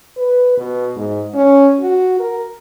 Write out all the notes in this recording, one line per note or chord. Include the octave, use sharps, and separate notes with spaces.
B4
B2
G#2
C#4
F#4
A#4